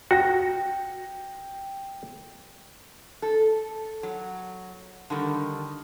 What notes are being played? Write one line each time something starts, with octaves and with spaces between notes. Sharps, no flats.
F#4 G5 A#6
A4
F#3
D3 D#3 G3